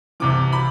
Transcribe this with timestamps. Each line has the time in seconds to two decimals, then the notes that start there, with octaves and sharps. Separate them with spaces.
0.20 C2 C3 E3 D6
0.53 B5